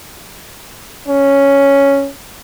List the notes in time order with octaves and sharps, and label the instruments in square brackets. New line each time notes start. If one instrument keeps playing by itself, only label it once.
[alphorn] C#4